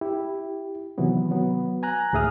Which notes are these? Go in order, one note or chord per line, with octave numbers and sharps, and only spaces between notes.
E4 G4
C3 D#3 E3 F#3 B3
F#3 B3
G#5 A#5 F#6
D2 A2 G#4 E5 D#6 F6